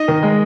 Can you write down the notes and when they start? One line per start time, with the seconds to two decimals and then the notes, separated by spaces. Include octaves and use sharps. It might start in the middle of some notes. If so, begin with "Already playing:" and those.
Already playing: D#4 D#5
0.08 D#3
0.23 G#3